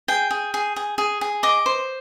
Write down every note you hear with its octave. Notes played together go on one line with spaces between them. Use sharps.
G#4 G5
G#4
G#4
G#4
G#4
G#4
D#5 D6
C5